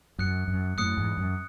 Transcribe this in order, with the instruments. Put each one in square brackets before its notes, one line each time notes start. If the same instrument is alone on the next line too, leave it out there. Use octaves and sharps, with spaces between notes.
[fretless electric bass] F#2 [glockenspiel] D#6 F#6 C#7
[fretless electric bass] F#2
[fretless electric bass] F#2 A2 [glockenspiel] D#6 F#6 C#7
[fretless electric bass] E2 G#2
F#2